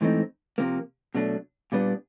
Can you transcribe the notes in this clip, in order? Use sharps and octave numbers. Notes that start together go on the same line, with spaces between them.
G#2 E3 A3 C4 D#4
C3 F3 A#3
B2 F#3 A3 D4
A#2 G3 B3 D4